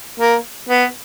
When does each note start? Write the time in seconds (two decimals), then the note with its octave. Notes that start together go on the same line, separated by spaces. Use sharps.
0.20 A#3
0.69 B3